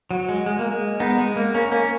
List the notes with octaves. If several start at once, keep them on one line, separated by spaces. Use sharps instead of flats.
F#3
G#3
G#3
A#3
G#3
B3 D#4
G#3
A#3
A#3 C#4
A#3 C#4